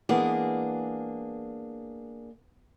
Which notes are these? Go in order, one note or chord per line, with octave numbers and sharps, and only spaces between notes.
E3 G#3 A#3 B3 D4 G#4